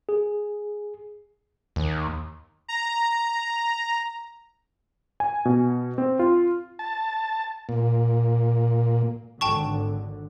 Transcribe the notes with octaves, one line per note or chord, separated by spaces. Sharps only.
G#4
D#2
A#5
G#5
B2
C4
F4
A5
A#2
G#1 D3 G5 A5 C#6